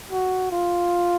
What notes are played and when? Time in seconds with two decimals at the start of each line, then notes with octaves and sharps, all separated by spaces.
0.12 F#4
0.52 F4